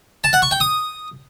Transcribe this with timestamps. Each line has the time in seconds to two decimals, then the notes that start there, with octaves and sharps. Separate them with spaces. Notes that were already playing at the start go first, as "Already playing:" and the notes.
0.24 A5
0.33 F#5
0.42 C#6
0.51 G5
0.60 D#6